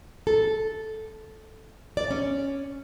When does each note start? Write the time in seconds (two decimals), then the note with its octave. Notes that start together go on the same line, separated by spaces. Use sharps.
0.27 A4
1.97 D5
2.11 C#4